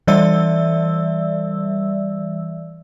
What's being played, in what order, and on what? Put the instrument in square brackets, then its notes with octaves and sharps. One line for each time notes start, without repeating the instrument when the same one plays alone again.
[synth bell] E3 G3 D5 E5 E6